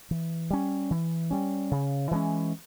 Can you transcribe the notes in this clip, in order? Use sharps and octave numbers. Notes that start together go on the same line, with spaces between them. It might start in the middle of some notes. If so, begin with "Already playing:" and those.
E3
G3 C#4
E3
G3 C#4
C#3
E3 G#3 C#4